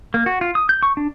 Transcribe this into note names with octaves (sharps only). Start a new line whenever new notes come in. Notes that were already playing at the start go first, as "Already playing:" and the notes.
A#3
F#4
F4
D#6
G6
C#6
D4